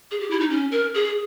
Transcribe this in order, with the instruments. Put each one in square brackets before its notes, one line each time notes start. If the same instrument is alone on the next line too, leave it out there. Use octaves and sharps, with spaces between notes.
[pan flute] G#4
G4
E4
D#4
C#4
A#4
G#4